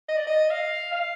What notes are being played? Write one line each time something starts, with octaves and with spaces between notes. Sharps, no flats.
D#5
D5
D#5
F5
F5